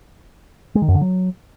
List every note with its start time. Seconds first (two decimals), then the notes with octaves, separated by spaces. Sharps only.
0.75 G#3
0.82 D#3
0.88 F#2
0.95 D3
1.01 F#3